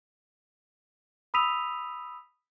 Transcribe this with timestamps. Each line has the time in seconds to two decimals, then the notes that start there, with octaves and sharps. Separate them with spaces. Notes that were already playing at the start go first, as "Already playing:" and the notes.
1.34 B5 D#6 E6 B6 D#7 F7